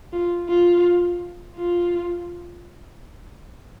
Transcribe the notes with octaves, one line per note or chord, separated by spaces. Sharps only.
F4
F4
F4